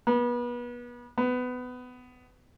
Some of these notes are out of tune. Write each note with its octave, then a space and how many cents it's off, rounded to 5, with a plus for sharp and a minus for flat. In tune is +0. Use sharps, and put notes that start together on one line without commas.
B3 -30
B3 +20